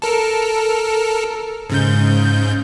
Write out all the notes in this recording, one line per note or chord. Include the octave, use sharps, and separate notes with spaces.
A4 A#4
G#2 C#3 G6